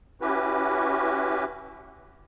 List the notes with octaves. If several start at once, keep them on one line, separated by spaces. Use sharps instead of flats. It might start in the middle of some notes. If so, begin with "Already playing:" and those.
C#4 E4 F#4 G4 B4